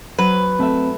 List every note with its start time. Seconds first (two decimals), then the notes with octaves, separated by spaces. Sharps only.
0.18 F#3 B4 C5
0.59 A3 C4 E5